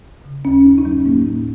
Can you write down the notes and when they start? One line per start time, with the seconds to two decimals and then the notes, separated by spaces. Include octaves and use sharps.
0.25 C#3
0.45 D#2 C#4
0.65 F#2 D#4
0.78 D#4
0.85 F#3
0.92 C#4
1.05 A2 A#3
1.27 A2